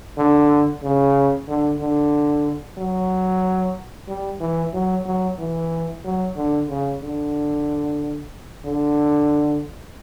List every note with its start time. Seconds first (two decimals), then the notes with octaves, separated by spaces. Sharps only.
0.18 D3
0.83 C#3
1.48 D3
1.80 D3
2.78 F#3
4.08 G3
4.40 E3
4.74 F#3
5.06 F#3
5.39 E3
6.04 F#3
6.36 D3
6.69 C#3
7.02 D3
8.64 D3